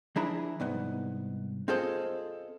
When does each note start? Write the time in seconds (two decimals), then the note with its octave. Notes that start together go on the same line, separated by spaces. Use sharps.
0.16 F3 D4 E4 G#4 A#5 B5
0.60 C2 G#2 B3
1.68 C4 F4 G#4 A4 C5 D#5